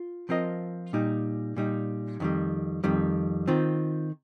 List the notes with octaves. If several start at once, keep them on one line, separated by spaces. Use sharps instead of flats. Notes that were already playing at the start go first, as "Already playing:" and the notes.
Already playing: F4
F3 C4 F4 A#4 D#5
A#2 G3 D#4
A#2 G3 D#4
F2 D#3 G3
F2 D#3 G3
D#3 C4 F4